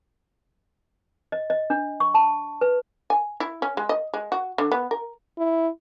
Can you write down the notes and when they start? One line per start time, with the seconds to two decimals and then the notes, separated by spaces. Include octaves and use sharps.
1.32 D#5
1.50 D#5
1.70 D4
2.00 C#6
2.14 A5
2.61 B4
3.10 G#5
3.40 E4
3.62 C#4
3.77 G#3
3.89 D#5
4.14 G#3
4.32 F#4
4.58 D3
4.72 B3
4.91 A#4
5.38 E4